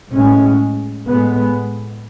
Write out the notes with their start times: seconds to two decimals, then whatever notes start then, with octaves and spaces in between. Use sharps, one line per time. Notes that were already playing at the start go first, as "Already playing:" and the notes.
0.11 A2 G#3 C#4
1.07 A2 G#3 B3